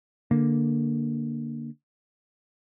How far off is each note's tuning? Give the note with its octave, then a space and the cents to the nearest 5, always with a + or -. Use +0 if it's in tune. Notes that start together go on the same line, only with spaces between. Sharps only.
D3 +0 A#3 +0